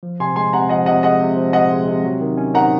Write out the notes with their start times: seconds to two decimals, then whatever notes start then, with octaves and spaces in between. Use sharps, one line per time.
0.03 F3
0.20 C3 G#5 C6
0.36 G#3 G#5 C6
0.53 C3 F#5 A#5
0.69 F3 D#5 F#5
0.86 C3 D#5 F#5
1.03 G#3 D#5 F#5
1.20 C3
1.37 F3
1.53 C3 D#5 F#5
1.70 G#3
1.88 C3
2.04 F#3
2.21 D#3
2.37 C#4
2.54 D#3 F#5 A#5